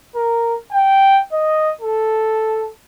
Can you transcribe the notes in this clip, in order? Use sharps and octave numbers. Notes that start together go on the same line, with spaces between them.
A#4
G5
D#5
A4